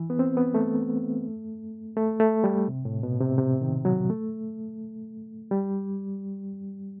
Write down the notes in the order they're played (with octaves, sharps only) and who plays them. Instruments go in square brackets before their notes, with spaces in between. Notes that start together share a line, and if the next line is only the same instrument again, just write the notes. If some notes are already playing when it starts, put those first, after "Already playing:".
Already playing: [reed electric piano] E3
B3
C4
B3
A3
A3
A3
G3
C3
A2
B2
C3
C3
D#3
F#3
A3
G3